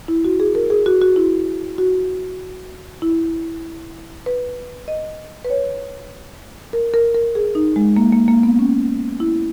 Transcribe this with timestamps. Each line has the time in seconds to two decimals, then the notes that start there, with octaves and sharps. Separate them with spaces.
0.08 E4
0.25 F#4
0.40 G#4
0.55 A#4
0.70 G#4
0.86 F#4
1.01 F#4
1.16 E4
1.78 F#4
3.02 E4
4.26 B4
4.88 D#5
5.45 B4
5.50 C#5
6.73 A#4
6.94 A#4
7.14 A#4
7.35 G#4
7.55 D#4
7.76 G#3
7.97 A#3
8.12 A#3
8.28 A#3
8.43 B3
8.59 C#4
9.20 E4